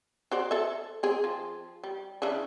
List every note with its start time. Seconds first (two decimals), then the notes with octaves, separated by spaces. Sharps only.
0.31 F#4 C5 D5
0.51 A4 E5
1.03 C4 G#4
1.24 F3
1.84 G3
2.22 C#3 E3 D4